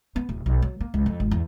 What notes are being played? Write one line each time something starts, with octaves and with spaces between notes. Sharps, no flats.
B3
D1
B1
F#3
A#3
C#2
F2
G#1
E2